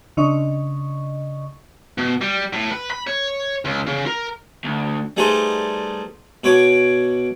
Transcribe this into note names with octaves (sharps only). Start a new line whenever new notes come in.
C#3 D4 D#5 C#6
B2
G3
A2
B4
B5
C#5
C#2
C#3
A#4
D2
G3 A3 D#4 G#4 B4 C5
B2 B4 C#5 C#6 D6